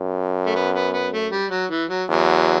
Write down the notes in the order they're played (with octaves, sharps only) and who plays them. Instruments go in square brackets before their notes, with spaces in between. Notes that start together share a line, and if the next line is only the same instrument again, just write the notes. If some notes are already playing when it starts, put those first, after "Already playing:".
Already playing: [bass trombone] F#2
[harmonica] A3
B3
B3
B3
A3
G3
F#3
E3
F#3
[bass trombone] E2 [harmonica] F#3